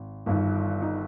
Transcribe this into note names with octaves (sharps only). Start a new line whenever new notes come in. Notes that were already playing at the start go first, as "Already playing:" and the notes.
Already playing: G#1
G1 G2 D#3
D#4